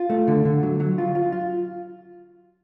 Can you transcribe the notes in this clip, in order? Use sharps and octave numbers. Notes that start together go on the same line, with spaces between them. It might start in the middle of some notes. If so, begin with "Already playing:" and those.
Already playing: F4
A3
D3
D3
F#3
F#3
F4
F4
F4